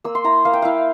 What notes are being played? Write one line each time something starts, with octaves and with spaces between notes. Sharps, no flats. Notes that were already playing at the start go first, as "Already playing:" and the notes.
A#3 E6
C6
E4 A#5
A#3 F5
G5
E4 F5